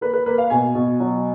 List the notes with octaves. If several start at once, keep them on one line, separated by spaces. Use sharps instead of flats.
A#3 B4
B4
A#3 B4
F5
B2 G#5
B2
F#3